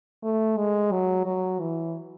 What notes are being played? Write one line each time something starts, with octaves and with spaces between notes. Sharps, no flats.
A3
G#3
F#3
F#3
E3